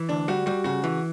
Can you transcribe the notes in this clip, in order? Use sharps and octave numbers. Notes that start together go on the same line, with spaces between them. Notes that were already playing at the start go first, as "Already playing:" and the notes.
Already playing: E3
D2 D4
G3 F#4
G3 F#4
C#3 F#4
E3